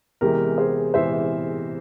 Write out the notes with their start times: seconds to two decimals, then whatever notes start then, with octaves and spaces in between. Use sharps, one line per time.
0.21 E2 C3 E3 G#3 G4 A#4
0.57 G#4 C5
0.94 E2 C3 E3 G#3 C5 E5